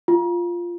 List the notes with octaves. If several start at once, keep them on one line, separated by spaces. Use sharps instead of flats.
F4